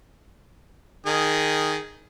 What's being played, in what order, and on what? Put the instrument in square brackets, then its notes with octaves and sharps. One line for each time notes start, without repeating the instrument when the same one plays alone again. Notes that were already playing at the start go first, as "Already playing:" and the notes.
[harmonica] D#3 G#4